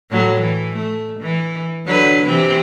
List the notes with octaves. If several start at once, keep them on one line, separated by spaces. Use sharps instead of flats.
A2 F#3
E3
A3
E3
D3 F#3 B4
C3 E3 C4